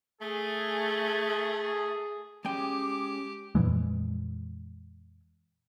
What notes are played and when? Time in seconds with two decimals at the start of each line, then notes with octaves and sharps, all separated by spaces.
0.22 A3 G#4
2.45 G#3 C#4 G4 G#4 G5 D6
3.55 F2 A#2 E3 G#3